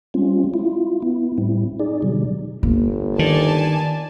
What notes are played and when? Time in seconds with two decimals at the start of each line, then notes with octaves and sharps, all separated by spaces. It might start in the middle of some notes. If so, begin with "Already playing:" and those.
0.14 G3 G#3 C4 C#4 F4
0.54 E4 F4
1.02 B3 E4
1.38 A2 G3 C4 E4
1.80 D#4 G#4 D5
2.02 B2 D3 F#3 G3
2.63 G1 A#3
3.19 D#3 D5 G#5 A5